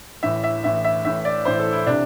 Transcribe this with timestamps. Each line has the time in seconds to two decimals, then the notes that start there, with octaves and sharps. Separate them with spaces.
0.23 A1 A2 E3 E5
0.44 E5
0.64 A1 A2 E3 E5
0.84 E5
1.04 A1 A2 E3 E5
1.25 D5
1.45 A1 A2 E3 C5
1.59 A4
1.73 E4
1.86 C3 E3 D4